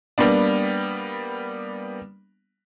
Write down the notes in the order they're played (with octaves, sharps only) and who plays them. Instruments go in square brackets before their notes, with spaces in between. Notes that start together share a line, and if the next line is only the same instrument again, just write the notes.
[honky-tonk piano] G3 A#3 B3 D4